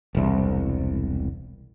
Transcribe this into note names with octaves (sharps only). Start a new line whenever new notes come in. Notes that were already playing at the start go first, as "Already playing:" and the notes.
E1 C2